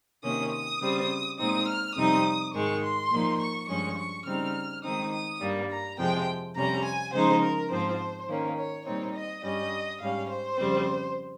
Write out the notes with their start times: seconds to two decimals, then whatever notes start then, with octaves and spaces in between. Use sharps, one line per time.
0.23 C3 D#3 A#3 C#4 D#6
0.52 D#6
0.80 C#3 G3 C4
1.38 A#2 G#3 C4 D#4 D#6
1.67 F6
1.95 F2 C3 G3 C4 D#4 D#6
2.53 G#2 D#3 G#3 C#6
2.82 C6
3.10 A#2 F3 A#3 D#4
3.39 C#6
3.68 G2 F3 G#3 C#4 C#6
3.97 C#6
4.25 C#3 G3 C4 D#4 F6
4.83 D#3 G#3 C4 D#4 D#6
5.12 D#6
5.41 G2 G3 A#3
5.70 A#5
5.98 F2 C3 F3 G#3 G5
6.55 F2 C3 G3 C#4 A#5
6.84 G#5
7.13 C#3 F3 G#3 D#4 C5
7.41 A#4
7.70 G#2 F3 C4 C5
8.28 D#3 A#3 C#4
8.57 C#5
8.85 A#2 G3 C4 D#4 C#5
9.14 D#5
9.43 G2 G3 C#4 D#5
10.00 G#2 G3 C#4 F5
10.29 C5
10.58 F2 C#3 G3 C4